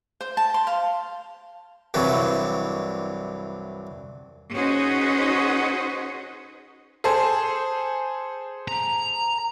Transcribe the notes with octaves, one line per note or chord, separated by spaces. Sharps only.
C5
A5
C6
F5
C2 G2 E3 F#3
C#4 D#4 F#4 G#4 B4 C5
G#4 A4 C5
A#5